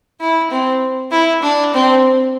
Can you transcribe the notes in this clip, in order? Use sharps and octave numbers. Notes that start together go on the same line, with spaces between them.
E4
C4
E4
D4
C4